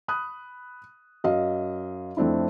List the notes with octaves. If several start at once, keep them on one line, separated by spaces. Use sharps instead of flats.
B5 D#6 F#6
F#2 D#5 F5
F2 A3 C4 D4 E4